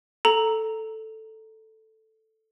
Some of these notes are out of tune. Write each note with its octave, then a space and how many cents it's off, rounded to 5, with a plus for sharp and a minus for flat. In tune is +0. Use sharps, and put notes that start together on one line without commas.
A4 +0 A#5 +0